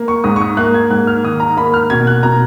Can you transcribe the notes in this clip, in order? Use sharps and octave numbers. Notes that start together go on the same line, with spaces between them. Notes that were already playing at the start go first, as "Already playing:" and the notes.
Already playing: A#3
C#6
G#2 D#6
C#6
D#6
A#3 F#6
G#6
G#2 F#6
F6
D#3 D#6
A#5
A#3 B5
F6
B2 G#6
F#6
B2 A#5